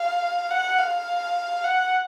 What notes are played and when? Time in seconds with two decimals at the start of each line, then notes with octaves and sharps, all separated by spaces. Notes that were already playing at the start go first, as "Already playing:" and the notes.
Already playing: F5
0.51 F#5
0.79 F5
1.64 F#5